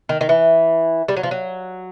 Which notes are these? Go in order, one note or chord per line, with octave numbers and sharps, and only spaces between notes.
D#3
D#3
E3
G3
F#3
F3
F#3